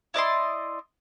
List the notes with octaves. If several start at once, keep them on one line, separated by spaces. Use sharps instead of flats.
E4 D5 D#5 C6